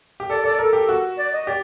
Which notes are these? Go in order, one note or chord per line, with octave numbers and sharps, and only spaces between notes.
G4
A4 D5
A4 D5
A4 A#4
G4
F#4
D5
D#5
G4 D5